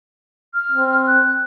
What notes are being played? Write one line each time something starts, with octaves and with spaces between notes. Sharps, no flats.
F6
C4
F#6